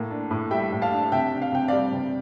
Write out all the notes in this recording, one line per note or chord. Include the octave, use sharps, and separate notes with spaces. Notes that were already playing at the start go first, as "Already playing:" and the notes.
Already playing: A2 A#3
D4
A2
G3 E5 G5
A2
F5 A5
D4
C3 E5 G5
D4
F5
C3 G5
G3 D5 F5
C3